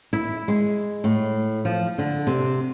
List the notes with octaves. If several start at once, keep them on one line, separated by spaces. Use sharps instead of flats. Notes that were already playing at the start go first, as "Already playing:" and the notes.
E4
G#3
A2
F3
D3
C3